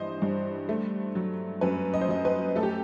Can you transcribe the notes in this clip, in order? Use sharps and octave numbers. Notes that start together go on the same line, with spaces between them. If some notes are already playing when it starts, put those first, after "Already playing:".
Already playing: G2 E3 C5 D#5
G2
A3
F#3
F#2 B4
D#5
C5
F#2 D#5
B4
A3 A4
G4